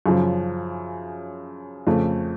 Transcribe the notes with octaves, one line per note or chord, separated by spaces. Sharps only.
F#2 C#3 F3
F2 C#3 A3